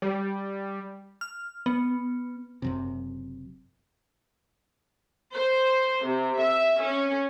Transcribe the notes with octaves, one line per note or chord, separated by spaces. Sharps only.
G3
F6
B3
F#1 F#2 C3
C5
C3
E5
C#4